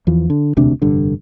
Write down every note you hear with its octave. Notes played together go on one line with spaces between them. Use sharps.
E2 E3 F3
D3
E1 D2 C3 D4
F1 G2 D3